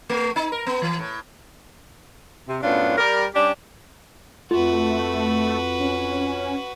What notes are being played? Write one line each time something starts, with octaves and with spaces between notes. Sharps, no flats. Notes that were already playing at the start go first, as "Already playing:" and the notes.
A3
D#4
A#4
B3
E3
A2
C3
F#2 A2 B3 C#4 D4 F4
G3 A#4
G3 C#4 D4 G4
F2 A3 F4 F#4 B4
C#4